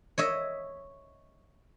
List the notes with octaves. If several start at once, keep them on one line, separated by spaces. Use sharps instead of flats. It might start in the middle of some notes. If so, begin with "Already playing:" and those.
C#5 D#5 E5